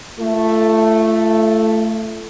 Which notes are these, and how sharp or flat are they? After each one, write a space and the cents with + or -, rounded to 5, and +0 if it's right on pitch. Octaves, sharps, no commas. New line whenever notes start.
A3 +0 F4 -35